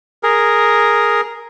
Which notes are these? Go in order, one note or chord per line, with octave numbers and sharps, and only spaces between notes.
G#4 A#4